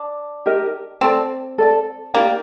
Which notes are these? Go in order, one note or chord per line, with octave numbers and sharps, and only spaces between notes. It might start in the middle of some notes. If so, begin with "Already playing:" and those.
Already playing: D4
D#4 G4 A#4 D#5
C4 A4 D5 A5
A4 D5 A5
A#3 D#4 G4 D5 G5